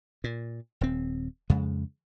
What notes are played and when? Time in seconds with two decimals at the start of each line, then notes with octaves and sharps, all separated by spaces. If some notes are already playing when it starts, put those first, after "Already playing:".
0.24 A#2
0.81 D#1 C4
1.50 F2 C#3 G#3